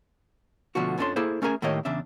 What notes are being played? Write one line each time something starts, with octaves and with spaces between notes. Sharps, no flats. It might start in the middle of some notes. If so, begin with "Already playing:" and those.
B2 D3 F3 A3 F#4
F2 F3 C#4 D4 A4 C6
A#3 E4 G#4 A4 C5
A3 C#4 G#4 A#4 G#5
A2 D#3 A#3 G4 C#5 D#5
E2 C#3 D4 E5